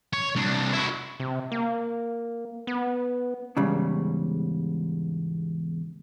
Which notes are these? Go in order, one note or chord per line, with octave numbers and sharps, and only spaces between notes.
C#5
C2 D4
E4 F#4
C3
A#3
B3
E2 G#2 C#3 G3